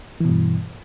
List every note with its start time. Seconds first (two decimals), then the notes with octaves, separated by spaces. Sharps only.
0.20 E3
0.25 B2
0.29 G2